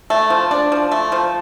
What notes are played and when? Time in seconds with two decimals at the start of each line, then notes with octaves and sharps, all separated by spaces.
0.10 A3
0.30 F3
0.51 D4
0.72 F3
0.91 A3
1.12 F3